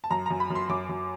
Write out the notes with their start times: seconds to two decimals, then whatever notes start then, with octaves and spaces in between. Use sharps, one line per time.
0.04 A5
0.11 F#2 A#5
0.26 F#2 A#5
0.40 B5
0.50 F#2
0.55 C6
0.69 F#2 D6
0.89 F#2